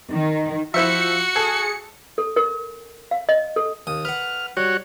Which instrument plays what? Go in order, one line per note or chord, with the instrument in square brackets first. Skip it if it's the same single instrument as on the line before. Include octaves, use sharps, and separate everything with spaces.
[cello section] D#3
[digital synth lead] F3 [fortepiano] E4 C5 E5 [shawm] F#4 [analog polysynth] C#7
[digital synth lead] G#4 [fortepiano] A4
[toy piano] A4
A#4
F5
D#5
A4
[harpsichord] D#2 D#6
[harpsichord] B4 F#5 [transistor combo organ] F6
[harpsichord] G3 [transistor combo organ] F#4 C#5